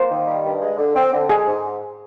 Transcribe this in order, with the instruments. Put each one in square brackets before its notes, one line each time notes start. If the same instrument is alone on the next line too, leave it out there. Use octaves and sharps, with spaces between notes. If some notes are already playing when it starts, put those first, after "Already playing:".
Already playing: [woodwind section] A#3 [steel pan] C5
[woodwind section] D#3
G3
G2
G#3
D3
C4
D3
[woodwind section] G#3 [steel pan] G#4
[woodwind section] G#2